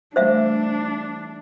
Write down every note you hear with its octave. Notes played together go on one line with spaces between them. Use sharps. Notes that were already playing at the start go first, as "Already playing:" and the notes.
E3 G3 A3 D4 C5 E5 F5